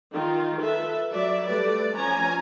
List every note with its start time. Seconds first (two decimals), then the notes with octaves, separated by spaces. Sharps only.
0.13 D#3 F4
0.61 A4 B4 E5
1.12 F#3 D5 E5
1.47 G3 A3 B4 D5
1.96 F3 C#4 G#5 A#5